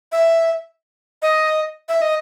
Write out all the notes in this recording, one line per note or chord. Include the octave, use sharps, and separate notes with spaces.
E5
D#5
E5
D#5